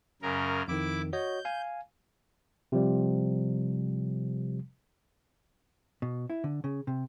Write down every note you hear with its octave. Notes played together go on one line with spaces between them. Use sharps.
F#2 C#3 A#4
F2 D#3 E4 D6
F#4 C#5 D#5 G6
F5 G#5
C3 F3 G3
B2
E4
D3
C#3
C3